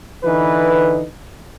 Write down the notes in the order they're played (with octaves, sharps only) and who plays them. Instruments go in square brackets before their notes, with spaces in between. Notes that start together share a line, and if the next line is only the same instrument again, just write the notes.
[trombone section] D3 E3 D#4 B4